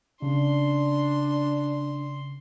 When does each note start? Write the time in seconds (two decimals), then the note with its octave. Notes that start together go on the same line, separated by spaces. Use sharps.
0.22 C#3 D4 C6